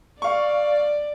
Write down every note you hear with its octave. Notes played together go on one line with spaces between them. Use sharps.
D5 F5 C#6